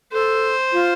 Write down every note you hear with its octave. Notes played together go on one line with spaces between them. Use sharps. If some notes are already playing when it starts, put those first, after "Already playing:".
A4 C5
F4